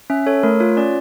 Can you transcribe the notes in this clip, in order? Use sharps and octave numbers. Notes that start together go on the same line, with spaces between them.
C#4 E5
A4 C#5
A3 A#4
F4 C#5
C#4 D5